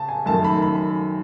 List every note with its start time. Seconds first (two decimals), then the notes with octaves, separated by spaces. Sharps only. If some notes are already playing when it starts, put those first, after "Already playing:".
Already playing: C#3 A5
0.09 G#5
0.26 F#2 D#3 A3 A5
0.44 B5
0.62 B5